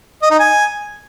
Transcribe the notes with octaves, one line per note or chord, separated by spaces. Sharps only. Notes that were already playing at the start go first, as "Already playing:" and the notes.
D#5
D#4
G#5